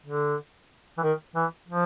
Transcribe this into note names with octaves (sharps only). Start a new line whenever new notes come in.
D3
E3
D#3
E3
F3